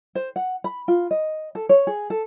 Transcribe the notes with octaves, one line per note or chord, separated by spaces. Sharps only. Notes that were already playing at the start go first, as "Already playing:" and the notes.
C5
F#5
B5
F4
D#5
A4
C#5
G#4
A4